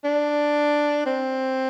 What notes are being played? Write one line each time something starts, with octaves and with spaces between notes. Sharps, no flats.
D4
C4